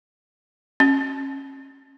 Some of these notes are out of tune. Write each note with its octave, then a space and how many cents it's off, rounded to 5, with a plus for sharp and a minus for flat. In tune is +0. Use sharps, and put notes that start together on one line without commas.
C#4 -30